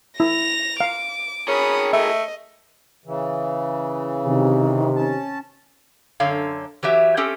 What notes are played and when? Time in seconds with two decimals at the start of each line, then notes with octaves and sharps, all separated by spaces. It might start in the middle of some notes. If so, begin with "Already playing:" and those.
0.20 E4 A#6 F7
0.80 F5 D6
1.48 C#4 G#4 A#4 B5 D#6
1.93 A3 D#5 E5
3.05 C#3 E3
4.24 C3 D#3
4.96 C#4 A5
6.20 F#2 D3 C#5 F5
6.83 E3 F#3 G4 E5
7.17 C4 C#4 G4 A4